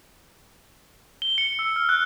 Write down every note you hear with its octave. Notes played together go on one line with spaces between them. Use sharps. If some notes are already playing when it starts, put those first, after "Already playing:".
G7
C#7
E6
F6
F#6